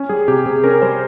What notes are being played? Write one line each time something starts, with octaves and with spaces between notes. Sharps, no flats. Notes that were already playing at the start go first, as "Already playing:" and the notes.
Already playing: C#4
G3 G#4
C3 G4
C3 G#4
C#4 A#4
G3 C5